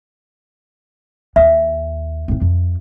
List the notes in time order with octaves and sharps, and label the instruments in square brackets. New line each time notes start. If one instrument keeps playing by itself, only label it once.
[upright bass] D#2 [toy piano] E5
[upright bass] G#2 C4
F2